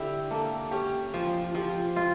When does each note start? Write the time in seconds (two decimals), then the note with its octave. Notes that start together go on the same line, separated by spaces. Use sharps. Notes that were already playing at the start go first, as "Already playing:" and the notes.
Already playing: D3 E4 G4
0.31 A#3 A4
0.71 C#4 G4
1.13 F3 F4
1.44 F4
1.55 F3 G4
1.96 F4